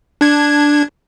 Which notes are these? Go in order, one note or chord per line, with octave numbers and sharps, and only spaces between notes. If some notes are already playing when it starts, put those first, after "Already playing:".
D4 G#6